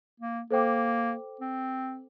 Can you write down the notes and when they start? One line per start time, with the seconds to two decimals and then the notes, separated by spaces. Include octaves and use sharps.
0.20 A#3
0.50 A#3 A4 C5 G5 D6
1.41 C4